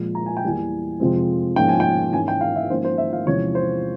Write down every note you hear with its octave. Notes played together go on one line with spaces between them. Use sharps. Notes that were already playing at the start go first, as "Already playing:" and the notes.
Already playing: A#2 F3 G#3
A#5
G#5
G5
E2 E3 G3 A#3 G#5
F2 C3 F3 G#3 C4
G#2 F3 A#3 C#4 G5
G#5
G5
G#2 E3 A#3 C#4 G#5
G5
F5
E5
G#2 F3 A#3 C#4 C5
C5
E5
F5
E2 C3 F3 G#3 C#4 C#5
C5